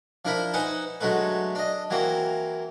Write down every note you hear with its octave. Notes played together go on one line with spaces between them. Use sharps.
F3 D4 E4 A#4 B5
D#4 B4 C5 F#5 G#5
D3 F#3 G#3 A3 B4
D4 D#5
E3 F#3 A#3 C4